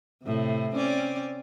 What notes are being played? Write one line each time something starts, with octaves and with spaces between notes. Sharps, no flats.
A2 C3
C4 C#4 D5